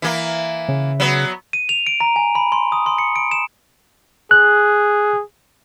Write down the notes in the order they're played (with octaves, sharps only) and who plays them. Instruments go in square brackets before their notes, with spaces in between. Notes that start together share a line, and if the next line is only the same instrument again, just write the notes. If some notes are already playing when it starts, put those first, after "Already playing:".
[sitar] E3 A#3
[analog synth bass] C#3
[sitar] F#3 B3
[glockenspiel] D#7
F7
D7
A#5
G#5
B5
C6
D#6
C6
C#7
D7
E7
[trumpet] G#4 [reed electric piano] F#6